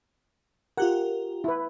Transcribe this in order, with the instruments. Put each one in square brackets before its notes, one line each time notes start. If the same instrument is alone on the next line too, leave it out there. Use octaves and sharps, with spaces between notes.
[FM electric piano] F4 G4 A#4 [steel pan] F#5
[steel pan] E4 B4